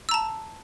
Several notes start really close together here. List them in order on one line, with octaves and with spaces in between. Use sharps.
E6 A#5 A5